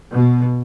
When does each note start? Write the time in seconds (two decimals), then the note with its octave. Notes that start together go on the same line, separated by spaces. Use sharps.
0.12 B2